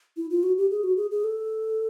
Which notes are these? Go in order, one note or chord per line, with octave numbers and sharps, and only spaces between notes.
E4
F4
F#4
G4
G#4
F#4
G#4
G#4
A4